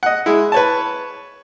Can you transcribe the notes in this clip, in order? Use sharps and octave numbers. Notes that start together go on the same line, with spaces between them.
D#5 F#5
G#3 E4
B4 C#5 A5